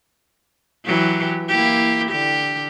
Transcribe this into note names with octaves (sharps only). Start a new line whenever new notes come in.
E3 F#3 G4
A#3 E4 G4
D3 G4